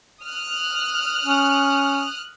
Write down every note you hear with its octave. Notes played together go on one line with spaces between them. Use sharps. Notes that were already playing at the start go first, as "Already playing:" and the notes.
D#6 F6 F#6
C#4